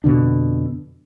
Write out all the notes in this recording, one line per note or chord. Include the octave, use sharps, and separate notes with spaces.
F2 B2 D3 D4